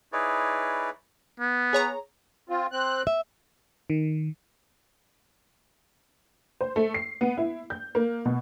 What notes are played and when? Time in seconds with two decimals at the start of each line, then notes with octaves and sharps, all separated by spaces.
0.13 D#4 E4 G#4 B4 C#5 D5
1.40 B3
1.73 G#4 C#5 A#5
2.49 C4 F4
2.72 C4 F#6
3.07 E5
3.90 D#3
6.61 C5
6.76 A3
6.94 C7
7.21 B3
7.37 E4
7.70 G6
7.95 A#3
8.25 B2